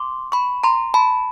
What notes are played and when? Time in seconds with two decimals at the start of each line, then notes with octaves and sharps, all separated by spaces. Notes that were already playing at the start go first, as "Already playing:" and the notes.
Already playing: C6 D6
0.32 B5 C#6
0.64 A#5 C6
0.94 A5 B5